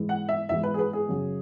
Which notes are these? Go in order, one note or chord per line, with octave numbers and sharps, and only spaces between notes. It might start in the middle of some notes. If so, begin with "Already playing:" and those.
Already playing: G#2 E3 G#3
F#5
E5
G#2 E3 G#3 E5
B4
G#4
B4
G#4
F#2 C#3 F#3